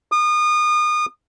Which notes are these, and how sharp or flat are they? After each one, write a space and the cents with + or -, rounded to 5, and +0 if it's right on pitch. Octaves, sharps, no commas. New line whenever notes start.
D#6 -35